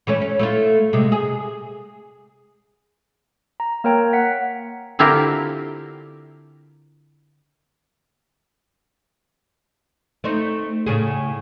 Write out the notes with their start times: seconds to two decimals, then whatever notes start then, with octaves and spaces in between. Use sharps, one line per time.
0.07 E3 A3 C#4
0.22 C#4
0.39 A3 E4 F4
0.93 C3 G#3
1.12 G#4
3.60 A#5
3.84 A#3 A#4 C#5 G5 A#5
4.13 F#5 B6
4.99 D3 C4 E4 F4 G4 A#4
10.24 A3 C4 D#4
10.86 A2 C#3 G#4